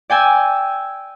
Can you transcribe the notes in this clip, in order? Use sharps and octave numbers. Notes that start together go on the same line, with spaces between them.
D5 G5 G#5 E6